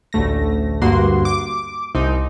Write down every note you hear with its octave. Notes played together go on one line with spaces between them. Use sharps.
A1 D2 A3 A#6
D2 G2 A#3 F#4 C6
D6
C2 C4 D#4